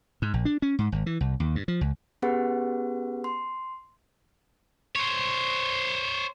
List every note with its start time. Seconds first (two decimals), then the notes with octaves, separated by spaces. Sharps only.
0.22 G#2
0.34 A#1
0.45 D4
0.62 C#4
0.79 G#2
0.92 G#1
1.06 E3
1.21 C2
1.40 D#2
1.55 G2
1.68 F3
1.81 C#2
2.22 B3 C#4 G4 G#4 B4 F#5
3.24 C6
4.96 C5 C#5